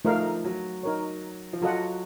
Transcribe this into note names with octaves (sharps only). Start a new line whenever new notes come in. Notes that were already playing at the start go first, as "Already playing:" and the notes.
F3 A3 D#4 A#4 F5
F#3
D#4 A#4 C#5
F3
F#3 F4 A4 D#5 F#5